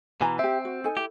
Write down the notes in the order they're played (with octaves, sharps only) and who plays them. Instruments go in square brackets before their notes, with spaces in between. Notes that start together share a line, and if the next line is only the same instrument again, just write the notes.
[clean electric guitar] B2 E3 [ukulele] G#5 A#5
[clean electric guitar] C4 [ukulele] G4 E5
[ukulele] F#4
D#4 A4 G#5
[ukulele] E4 [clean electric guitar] G4